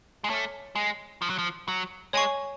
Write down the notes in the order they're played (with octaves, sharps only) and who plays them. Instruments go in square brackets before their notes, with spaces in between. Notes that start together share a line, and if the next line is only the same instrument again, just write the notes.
[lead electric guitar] G#3
[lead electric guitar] A3 [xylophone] C#5 G#5 D6 F6
[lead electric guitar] G#3
F3
F#3
F3
F#3
[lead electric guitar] G#3 [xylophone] C#5 G#5 C#6